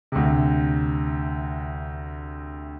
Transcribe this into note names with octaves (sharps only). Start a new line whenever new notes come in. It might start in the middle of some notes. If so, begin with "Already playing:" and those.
D2 C3